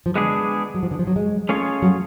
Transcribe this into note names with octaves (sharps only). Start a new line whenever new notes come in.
F3
D3 G#3 B3 D4 G#4
F#3
F3
D3
F3
F#3
G#3
A3 C#4 F4 G#4 C#5
F#3